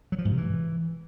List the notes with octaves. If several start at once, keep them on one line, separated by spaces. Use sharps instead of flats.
F#3
F3
G#2
C3
E3